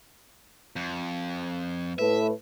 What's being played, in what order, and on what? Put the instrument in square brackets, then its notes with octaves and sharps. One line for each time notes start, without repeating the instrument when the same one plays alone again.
[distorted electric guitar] F2
[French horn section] A2 A3 B4 [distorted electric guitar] E5